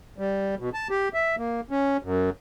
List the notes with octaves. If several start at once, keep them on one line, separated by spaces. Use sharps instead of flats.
G3
B2
A5
G4
E5
A#3
C#4
F#2